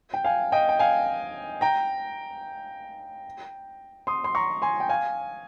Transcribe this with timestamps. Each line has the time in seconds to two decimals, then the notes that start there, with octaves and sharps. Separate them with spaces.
0.14 G5
0.24 F5 G#5
0.52 D#5 G5
0.69 G5
0.79 F5 G#5
1.61 G5 A#5
4.07 C6 D#6
4.24 C6
4.35 A#5 C#6
4.62 G#5 C6
4.80 G5
4.89 F5 G#5